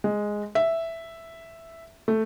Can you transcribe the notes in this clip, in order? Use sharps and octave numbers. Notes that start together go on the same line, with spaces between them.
G#3
E5
A3